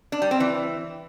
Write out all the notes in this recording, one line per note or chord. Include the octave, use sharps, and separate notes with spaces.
D4
G3
C4
E3